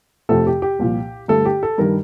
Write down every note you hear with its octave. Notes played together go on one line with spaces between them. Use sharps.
F2 C3 F3 A3 A4
G4
G4
C2 A#2 F3
G2 D3 A3 A4
G4
A4
G2 D#3 G3 A#4